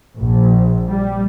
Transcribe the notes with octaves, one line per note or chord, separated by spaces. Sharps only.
A#1
G3